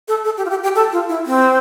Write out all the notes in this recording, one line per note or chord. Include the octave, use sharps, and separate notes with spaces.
A4
A4
G4
F4
G4
G4
A4
F4
E4
C4